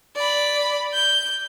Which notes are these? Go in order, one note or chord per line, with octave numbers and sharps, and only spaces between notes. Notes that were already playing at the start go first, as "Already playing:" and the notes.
D5 B5
G6